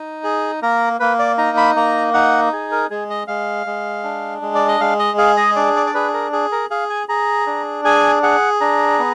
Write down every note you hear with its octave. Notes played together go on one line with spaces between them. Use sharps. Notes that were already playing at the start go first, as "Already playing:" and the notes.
Already playing: D#4
G#4
A#3 A#4
A#3 B4
D5
D#4 A#5
B5
A#3 A#5
D#4 F#5
G#4
A#4
G#3 G#4
D#5
G#3 F5
G#3
D4
G#3
D5
D#5
G#3 F5
D#5
G#4 F5
D#5
D4 D5
D5
D5
G#4 B4
A#4
G#4
A#4
G#4 F5
G#5
G#4 A#5
D4
G#4 G#5
G#4 F#5
D4 A#5
B3